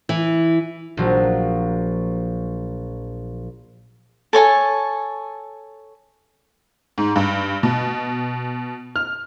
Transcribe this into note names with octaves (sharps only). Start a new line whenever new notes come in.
E3
A#1 F3 F#3
A4 C#5 G#5 A5
G#2
G2
B2
F6